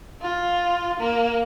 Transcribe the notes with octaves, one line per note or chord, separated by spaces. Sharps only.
F4
A#3